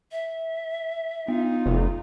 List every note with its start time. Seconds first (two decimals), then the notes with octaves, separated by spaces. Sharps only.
0.12 E5
1.28 B3 D#4 F4
1.66 F1